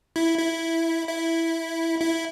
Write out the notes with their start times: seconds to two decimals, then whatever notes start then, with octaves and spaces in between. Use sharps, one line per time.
0.16 E4
0.39 E4
1.08 E4
2.00 E4